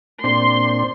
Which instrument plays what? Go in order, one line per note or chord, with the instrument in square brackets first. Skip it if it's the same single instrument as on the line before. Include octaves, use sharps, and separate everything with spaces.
[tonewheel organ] A#2 C4 D4 [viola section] C6